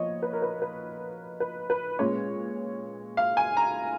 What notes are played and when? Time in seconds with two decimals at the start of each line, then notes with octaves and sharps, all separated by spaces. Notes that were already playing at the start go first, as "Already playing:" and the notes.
Already playing: A#2 F3 B3 C#5 D#5
0.23 B4
0.33 A#4
0.42 B4
0.62 B4
1.40 B4
1.70 B4
1.99 A#2 G#3 C#4 C#5
3.17 F5
3.37 G#5
3.57 A#5